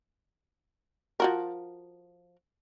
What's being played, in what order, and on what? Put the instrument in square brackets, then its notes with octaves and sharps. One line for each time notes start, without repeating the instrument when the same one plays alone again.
[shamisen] F3 F#4 A#4